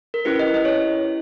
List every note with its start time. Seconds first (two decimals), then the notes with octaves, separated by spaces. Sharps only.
0.14 A#4
0.25 C#4 E4 G4 B4
0.39 D#5
0.54 D#5
0.65 C#5